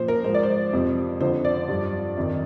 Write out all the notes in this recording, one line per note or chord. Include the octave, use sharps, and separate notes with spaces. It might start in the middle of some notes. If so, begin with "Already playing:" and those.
Already playing: A#2 F3 C5
A#4
G#2 F3 C5
D5
C5
F2 C3 F3
F2 D3 F3 C5
D5
G2 F3
F2 D#3